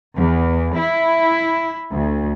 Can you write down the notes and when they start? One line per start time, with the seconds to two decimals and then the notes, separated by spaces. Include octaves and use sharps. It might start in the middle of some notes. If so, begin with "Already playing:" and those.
0.16 E2
0.76 E4
1.93 D2